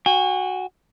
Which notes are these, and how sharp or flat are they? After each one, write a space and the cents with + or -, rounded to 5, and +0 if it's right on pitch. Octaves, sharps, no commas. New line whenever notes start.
F#4 +0 G#5 -45